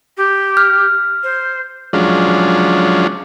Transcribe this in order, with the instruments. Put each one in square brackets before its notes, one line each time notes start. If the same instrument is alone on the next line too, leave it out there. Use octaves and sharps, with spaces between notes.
[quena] G4
[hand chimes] F6
[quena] C5
[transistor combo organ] F3 F#3 G#3 C#4 D4 F4